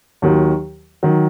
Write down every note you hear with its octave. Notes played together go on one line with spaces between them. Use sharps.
D#2 D#3 F#3
D#3 F#3